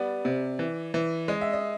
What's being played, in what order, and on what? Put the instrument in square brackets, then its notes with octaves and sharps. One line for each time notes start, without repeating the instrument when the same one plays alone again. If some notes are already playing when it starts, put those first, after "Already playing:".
Already playing: [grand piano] G3 B3 [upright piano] D5
[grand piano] C3
E3
E3
[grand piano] G#3 [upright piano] D#5
[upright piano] E5
D#5